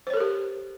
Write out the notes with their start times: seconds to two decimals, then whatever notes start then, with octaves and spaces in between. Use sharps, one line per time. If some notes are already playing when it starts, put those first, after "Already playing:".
0.07 C5
0.10 C#5
0.14 A4
0.17 A#4
0.20 G4